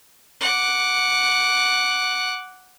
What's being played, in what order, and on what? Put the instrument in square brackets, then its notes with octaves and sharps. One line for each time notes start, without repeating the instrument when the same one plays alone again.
[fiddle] F#5 D6